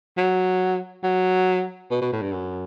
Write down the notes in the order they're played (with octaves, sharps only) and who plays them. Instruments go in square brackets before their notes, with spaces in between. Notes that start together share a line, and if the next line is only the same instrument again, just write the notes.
[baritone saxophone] F#3
F#3
B2
B2
A2
G2
F#2